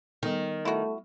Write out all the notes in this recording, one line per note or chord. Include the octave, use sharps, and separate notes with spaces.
D#3 G3 B3 A4
A3 E4 F#4